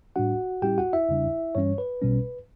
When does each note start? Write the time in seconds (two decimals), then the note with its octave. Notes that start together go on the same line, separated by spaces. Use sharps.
0.16 A2 G3 D4 F#4 F#5
0.62 A2 G3 C#4 E4 G4 G5
0.78 F#4 F#5
0.93 E4 E5
1.09 E2 C#3 G3 D4
1.55 G2 E3 G3 C#4 C#5
1.78 B4
2.02 B1 B2 G3 C#4